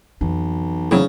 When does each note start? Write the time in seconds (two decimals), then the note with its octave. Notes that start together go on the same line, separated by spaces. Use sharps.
0.21 B1 F2 E3
0.91 D2 C#3 F#3 C4 E4